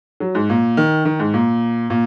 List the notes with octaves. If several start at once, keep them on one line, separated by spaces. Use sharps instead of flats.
F#3
G#2
A#2
D#3
D#3
G#2
A#2
A#2